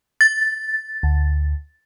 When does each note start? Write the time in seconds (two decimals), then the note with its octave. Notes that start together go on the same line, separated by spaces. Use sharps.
0.21 A6
1.03 D2